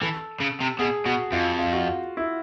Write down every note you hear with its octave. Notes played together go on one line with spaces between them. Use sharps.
E3 A4
C#3
C3
B2 G#4
B2 F#4
F2 F4
F4
F#4
F4
E4